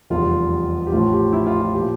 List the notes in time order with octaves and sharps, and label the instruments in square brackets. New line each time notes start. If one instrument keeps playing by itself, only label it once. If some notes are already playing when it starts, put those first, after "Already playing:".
[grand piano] F1 E2 C3 G3 F4
G4
A1 A2 F3 F4
G4
E4
F4
F4
A#2 F3 G4